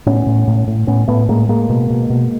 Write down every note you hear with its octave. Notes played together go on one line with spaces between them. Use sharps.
A2 B3 C#4
A2
A2
A2
A2 B3 C#4
A2 A3 B3
A2 G#3 A#3
A2 G#3 A#3
B2
B2
B2